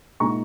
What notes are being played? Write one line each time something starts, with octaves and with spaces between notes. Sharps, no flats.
A#2 G#3 D#4 A#5 C#6